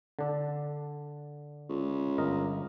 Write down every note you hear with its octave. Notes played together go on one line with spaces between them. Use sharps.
D3 D4 A4
C#2
G1 A#4 D#5